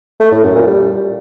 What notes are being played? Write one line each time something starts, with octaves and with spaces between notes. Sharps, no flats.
A3
A2
F#2
A#2
G3